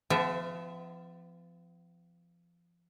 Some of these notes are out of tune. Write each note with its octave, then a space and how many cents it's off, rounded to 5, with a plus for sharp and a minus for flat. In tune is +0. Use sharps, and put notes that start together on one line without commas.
F3 -20 B3 +45 E5 +0